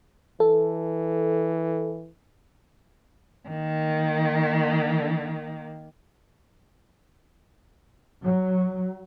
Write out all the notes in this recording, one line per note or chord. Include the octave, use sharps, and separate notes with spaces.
E3 A4
D#3 A#3
F#3